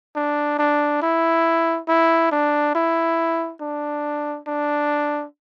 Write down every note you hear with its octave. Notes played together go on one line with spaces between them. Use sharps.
D4
D4
E4
E4
D4
E4
D4
D4